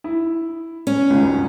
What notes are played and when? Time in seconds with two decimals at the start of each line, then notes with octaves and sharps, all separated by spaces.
0.04 E4
0.87 C#4
1.10 G1 C#2 D#3
1.23 F#2 B2